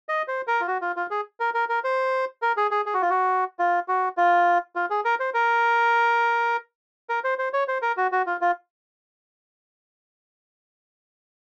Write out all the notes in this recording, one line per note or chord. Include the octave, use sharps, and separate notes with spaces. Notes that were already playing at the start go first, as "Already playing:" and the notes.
D#5
C5
A#4
F4
F#4
F4
F4
G#4
A#4
A#4
A#4
C5
A#4
G#4
G#4
G#4
F#4
F4
F#4
F4
F#4
F4
F4
G#4
A#4
C5
A#4
A#4
C5
C5
C#5
C5
A#4
F#4
F#4
F4
F4